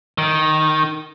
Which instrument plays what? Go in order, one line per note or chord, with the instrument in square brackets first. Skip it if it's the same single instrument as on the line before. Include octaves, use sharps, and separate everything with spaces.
[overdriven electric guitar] D#3